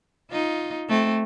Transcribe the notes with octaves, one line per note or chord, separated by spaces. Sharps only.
D#4 F4
A3 C4